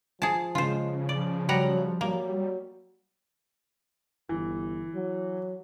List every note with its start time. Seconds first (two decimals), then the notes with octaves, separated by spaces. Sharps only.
0.22 F3 G#4 A5
0.55 C#3 G#3 F4 C5
1.09 F3 D5
1.49 F#3 G3 F#5 A#5
2.01 F#3 G3 A#3
4.29 G1 E3
4.95 F#3